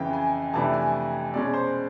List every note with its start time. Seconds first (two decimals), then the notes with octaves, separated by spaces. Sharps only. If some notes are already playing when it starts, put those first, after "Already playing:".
Already playing: F2 C#3 E3 G5
0.13 G#5
0.53 F2 C3 E3 A3 D4 A5
0.73 G#5
1.33 B2 G#3 C#4 D5
1.54 C5